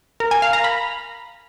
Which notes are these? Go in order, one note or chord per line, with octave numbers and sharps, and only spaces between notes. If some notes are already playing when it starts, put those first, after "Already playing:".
A#4
G#5
F5
A#5
B5